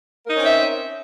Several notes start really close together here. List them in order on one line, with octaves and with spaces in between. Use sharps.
A#4 D#4 C#4 C4 E5